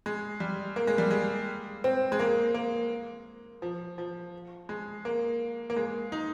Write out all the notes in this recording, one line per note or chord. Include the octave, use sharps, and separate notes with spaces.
G#3
G3
A#3
G#3
G3
G#3
C4
G#3
A#3
A#3
F3
F3
G#3
A#3
A#3
G#3
D#4